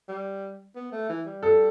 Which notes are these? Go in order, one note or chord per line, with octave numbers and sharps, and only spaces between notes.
G3
B3
A3
E3
G3
A4